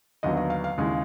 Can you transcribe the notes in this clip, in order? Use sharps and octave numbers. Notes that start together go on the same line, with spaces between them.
D#2 D3 F#3 B3 D#5
D#5
F5
F5
D#2 C#3 E3 G#3